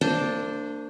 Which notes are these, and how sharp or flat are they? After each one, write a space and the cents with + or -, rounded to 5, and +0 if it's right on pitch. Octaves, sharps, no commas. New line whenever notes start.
A#3 -35 D4 +0 C5 +0